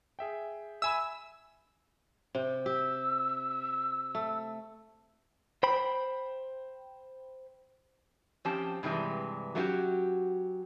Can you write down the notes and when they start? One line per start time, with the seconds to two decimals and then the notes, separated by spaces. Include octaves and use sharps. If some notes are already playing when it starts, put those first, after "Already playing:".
0.19 G#4 E5 G5
0.82 E5 G#5 B5 E6
2.35 C3 G5
2.66 G4 E6
4.15 A3
5.63 C5 G5 B5
8.45 F3 C4 C#4 G4 A5
8.83 G2 C3 E3 G#3
9.55 F#3 A3 C#4 E4 F#4 G4